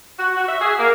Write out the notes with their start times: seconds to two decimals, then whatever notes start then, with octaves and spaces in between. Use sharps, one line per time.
0.19 F#4
0.36 F#4
0.48 E5
0.61 G#4
0.78 A#3